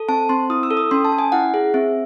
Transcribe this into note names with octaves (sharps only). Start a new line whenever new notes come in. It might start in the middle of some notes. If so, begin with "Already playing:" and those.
Already playing: A4
C4 A5
C4 C6
E4 D#6
E6
A4
D#6
C#4 C6
A5
C#4
G#5
E4 F#5
G#4
C4 E5